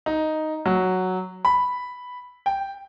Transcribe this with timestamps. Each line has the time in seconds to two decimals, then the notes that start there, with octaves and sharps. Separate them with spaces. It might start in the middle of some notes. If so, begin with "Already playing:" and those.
0.06 D#4
0.66 F#3
1.45 B5
2.46 G5